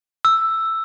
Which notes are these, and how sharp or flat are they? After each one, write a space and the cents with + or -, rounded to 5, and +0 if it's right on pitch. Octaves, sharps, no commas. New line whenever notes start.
E6 +5